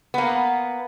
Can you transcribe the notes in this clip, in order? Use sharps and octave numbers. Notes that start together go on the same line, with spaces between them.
A#3 B3